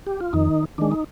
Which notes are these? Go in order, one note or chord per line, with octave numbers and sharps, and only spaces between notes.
G4
F4
F2 D#3 D#4
D#3 G#3 D4
D#4